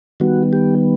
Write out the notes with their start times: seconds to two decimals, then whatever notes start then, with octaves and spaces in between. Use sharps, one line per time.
0.20 D#3 G3 B3 F#4
0.53 G4